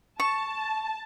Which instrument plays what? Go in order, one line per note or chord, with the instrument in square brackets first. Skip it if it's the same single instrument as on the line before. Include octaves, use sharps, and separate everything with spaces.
[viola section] A5 [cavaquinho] C#6